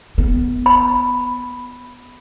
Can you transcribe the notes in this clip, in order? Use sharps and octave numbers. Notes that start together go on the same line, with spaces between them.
B3
B5